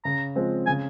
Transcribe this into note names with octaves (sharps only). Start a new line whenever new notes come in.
C#3 A#5
F3 G#3 C4
C#3 G#5